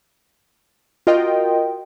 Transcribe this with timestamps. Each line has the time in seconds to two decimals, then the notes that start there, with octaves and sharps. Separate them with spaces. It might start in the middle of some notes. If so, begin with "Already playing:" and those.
1.07 F4 F#4 A#4 D#5 G5